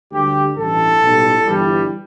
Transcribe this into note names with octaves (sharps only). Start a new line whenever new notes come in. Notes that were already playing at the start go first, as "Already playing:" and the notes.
D2 D3 G3 G4
A1 G2 E3 A4
B1 A2 G3
G1 G2 E3 G3